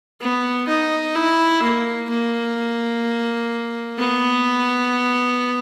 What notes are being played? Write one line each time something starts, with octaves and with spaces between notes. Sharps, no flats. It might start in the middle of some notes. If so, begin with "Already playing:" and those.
B3
D#4
E4
A#3
A#3
B3